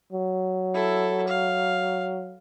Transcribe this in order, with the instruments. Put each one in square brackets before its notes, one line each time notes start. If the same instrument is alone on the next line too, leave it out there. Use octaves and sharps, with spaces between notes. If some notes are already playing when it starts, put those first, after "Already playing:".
[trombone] F#3
[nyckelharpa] E4 A4
F5